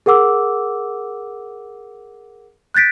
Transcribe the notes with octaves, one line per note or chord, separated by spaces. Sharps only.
G#4 A#4 F#5 D6 E6
F#6 G6 A6 B6 D7